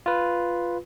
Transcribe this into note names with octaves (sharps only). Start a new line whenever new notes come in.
F4 B4